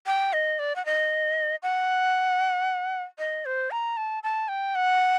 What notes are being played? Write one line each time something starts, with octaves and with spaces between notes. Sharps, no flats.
G5
D#5
D5
F#5
D#5
F#5
D#5
C5
A#5
A5
A5
G5
F#5